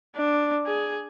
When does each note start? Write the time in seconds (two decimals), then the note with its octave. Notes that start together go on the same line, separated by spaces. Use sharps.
0.16 D4
0.67 G#4